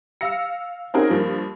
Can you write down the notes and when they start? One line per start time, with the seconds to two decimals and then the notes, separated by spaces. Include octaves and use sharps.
0.21 F5 E6 A#6 C#7
0.94 C4 C#4 D#4 F#4 G#4 A#4
1.09 G2 F3 A#3